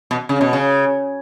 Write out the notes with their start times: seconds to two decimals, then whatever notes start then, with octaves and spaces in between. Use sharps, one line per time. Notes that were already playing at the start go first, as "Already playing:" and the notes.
0.11 B2
0.29 C#3
0.41 B2
0.53 C#3